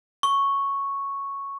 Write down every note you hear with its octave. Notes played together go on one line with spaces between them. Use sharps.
C#6